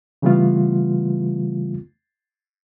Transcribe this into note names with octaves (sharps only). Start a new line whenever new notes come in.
C#3 E3 G3 A3 B3 F4